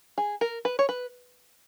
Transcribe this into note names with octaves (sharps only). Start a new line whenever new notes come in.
G#4
A#4
B4
C#5
B4